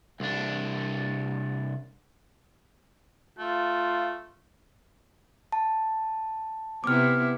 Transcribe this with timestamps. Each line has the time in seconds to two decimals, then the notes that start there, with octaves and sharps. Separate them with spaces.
0.20 C2 D4
3.39 A3 F4
5.52 A5
6.84 C3 B3 E4 D6 F6